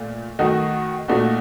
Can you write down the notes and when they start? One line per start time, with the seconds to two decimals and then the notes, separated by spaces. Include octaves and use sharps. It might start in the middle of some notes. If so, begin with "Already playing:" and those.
Already playing: A#2 A3
0.39 D#3 A3 D#4 F#4
1.08 A#2 A3 D#4 F#4